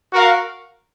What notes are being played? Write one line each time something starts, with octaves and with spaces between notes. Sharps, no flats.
F#4 A#4 F5